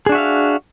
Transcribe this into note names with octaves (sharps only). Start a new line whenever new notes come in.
D4 F#4 G#4 E5 F5